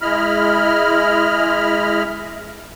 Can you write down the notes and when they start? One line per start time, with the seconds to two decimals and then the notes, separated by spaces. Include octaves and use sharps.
0.01 G#3 E4 D#5 B5 F6